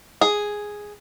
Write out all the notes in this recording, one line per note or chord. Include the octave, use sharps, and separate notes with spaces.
G#4